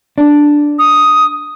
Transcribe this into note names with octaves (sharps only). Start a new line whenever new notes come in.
D4
D#6